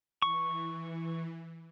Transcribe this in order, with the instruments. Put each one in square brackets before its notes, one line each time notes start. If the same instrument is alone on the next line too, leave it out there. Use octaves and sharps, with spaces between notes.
[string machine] E3 [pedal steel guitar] C#6